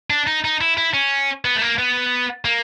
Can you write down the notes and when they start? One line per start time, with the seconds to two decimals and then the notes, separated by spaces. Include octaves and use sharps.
0.10 D4
0.27 D#4
0.44 D#4
0.61 E4
0.77 E4
0.94 C#4
1.45 B3
1.56 A3
1.62 A#3
1.78 B3
2.45 A#3